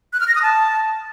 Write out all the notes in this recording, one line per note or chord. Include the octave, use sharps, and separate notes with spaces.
F#6
F6
A#6
D#6
A5